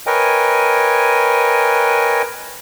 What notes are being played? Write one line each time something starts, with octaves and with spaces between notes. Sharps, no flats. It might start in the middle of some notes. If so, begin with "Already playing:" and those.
A#4 B4 C#5 D#5 G5 G#5